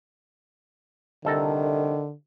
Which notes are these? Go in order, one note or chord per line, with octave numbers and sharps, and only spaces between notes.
C2 D3 D#3 A4 A#5